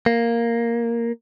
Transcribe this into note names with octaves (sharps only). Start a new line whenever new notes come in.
A#3